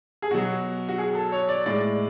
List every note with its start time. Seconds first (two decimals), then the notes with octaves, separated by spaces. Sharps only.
0.22 G#4
0.31 B2 F#3 F#4
0.89 F#4
0.98 G#4
1.15 A4
1.32 C#5
1.49 D5
1.66 A2 G#3 D5